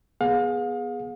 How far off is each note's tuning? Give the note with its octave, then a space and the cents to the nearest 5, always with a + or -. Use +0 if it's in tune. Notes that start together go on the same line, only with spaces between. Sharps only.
B3 -10 G#4 +0 F5 +40